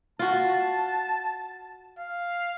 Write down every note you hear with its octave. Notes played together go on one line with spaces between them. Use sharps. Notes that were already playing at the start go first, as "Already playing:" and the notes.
F4 F#4 A5
F5